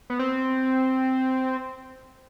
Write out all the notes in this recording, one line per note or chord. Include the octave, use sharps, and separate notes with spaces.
B3
C4